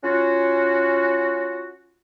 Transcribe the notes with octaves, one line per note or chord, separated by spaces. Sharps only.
C#4 F4 F#4